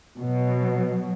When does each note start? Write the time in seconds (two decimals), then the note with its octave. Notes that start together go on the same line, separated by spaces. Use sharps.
0.19 B2 F#3